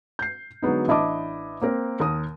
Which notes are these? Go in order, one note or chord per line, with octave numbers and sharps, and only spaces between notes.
G6 C7
D3 F#3 G#3 B3 D#4
A1 D4 E4 D#5 A5 D6
A#3 C4 A#4 C5
D#2 A#4 D#6